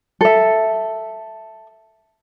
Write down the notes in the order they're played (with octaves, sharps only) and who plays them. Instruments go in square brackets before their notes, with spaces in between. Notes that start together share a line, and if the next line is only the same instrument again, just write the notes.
[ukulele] A4 E5